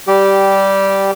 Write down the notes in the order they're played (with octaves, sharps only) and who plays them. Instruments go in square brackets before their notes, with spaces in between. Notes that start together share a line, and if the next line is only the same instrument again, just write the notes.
[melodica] G3 G4